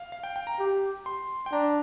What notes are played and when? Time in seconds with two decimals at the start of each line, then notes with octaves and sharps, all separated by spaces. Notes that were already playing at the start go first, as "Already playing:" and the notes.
Already playing: F5
0.12 F5
0.23 G5
0.36 G5
0.47 A#5
0.59 G4
1.06 C6
1.46 G5
1.52 D4 A#5